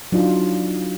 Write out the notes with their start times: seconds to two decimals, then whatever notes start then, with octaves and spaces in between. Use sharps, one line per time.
0.12 F#3 D4 D#4 F4